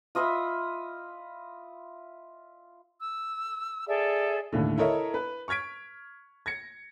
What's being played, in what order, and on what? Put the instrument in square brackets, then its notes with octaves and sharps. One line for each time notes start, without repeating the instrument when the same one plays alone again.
[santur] F4 D#5 E5 B5
[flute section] E6
G#4 A4 D5 E5
[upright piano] D#2 A2 D3
E4 A4 A#4 C#5 D#5 E5
B4
C#6 F6 G#6 B6 D7
G#6 A#6 C#7